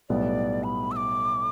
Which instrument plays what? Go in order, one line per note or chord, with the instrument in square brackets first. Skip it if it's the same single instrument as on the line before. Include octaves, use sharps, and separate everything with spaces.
[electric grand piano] B1 A2 G3 B3 [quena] D5
[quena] B5
E6
D6